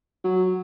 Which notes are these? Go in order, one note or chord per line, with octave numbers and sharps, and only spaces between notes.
F#3